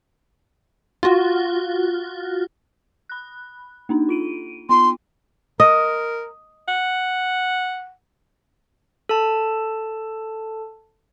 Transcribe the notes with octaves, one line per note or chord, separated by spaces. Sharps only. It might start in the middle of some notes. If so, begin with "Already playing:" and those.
F4 F#4
B5 F#6
A#3 D4 D#4
F4 D7 D#7
B3 F4 C6
A#4 D#5
F#5
A4 A5